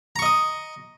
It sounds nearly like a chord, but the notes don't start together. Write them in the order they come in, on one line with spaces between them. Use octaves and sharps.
A#5 C#6 D#5 D#6